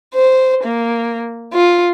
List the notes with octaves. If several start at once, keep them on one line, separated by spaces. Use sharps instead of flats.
C5
A#3
F4